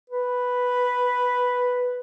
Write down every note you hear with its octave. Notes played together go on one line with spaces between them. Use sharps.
B4